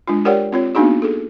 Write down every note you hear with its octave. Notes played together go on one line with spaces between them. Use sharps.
G#3 D4 F4
G4 A#4 C#5 D5 F#5 G5
C4 F4 C#5
A#3 B3 D4 D#4 F#4 G#4
G#4 A4